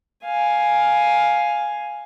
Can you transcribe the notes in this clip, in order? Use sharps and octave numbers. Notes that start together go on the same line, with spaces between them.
F5 G#5